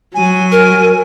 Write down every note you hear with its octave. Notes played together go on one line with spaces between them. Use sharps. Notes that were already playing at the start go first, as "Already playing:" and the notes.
F#3 G#5
A#4